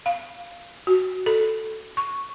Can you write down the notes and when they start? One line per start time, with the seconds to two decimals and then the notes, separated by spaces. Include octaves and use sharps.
0.06 F5
0.87 F#4
1.26 A4
1.97 C#6